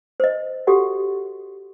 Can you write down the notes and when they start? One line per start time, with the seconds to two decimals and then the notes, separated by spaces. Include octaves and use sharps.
0.20 C5 D#5
0.67 F#4 G4 A4 F#5